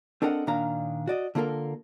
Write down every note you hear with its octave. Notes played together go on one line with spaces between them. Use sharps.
C4 D4 A4 A#4 D#5 F#5
A#2 D#3 D4 F5 A#5
F#4 D5 D#5
D3 A#3 F4 A4 A#4